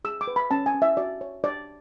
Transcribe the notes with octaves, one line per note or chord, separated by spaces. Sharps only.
G#4 E6
D6
B4
B5
C#4 A5
G#5
C#4
E5
F#4 D5
C#5
D4 D5